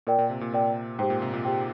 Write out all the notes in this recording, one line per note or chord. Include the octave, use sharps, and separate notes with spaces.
A#2 A#4 D5 G5
A#2
C3
A#2
A#2 A#4 D5 G5
G#2 G4 C5 G5
A#2
C3
A#2
G4 C5 G5